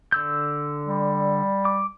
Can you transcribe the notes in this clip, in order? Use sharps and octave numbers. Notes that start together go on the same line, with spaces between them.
D3 E6 G6
G3
D6